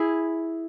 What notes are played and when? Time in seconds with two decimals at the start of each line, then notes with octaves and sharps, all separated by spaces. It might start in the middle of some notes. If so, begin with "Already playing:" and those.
Already playing: E4 G#4